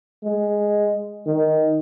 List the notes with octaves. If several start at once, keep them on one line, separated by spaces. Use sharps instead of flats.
G#3
D#3